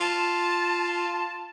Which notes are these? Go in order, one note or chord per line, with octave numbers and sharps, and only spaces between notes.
F4 A5